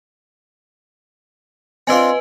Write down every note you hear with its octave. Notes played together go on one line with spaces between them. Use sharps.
C4 D4 F4 B4 D#5 G#5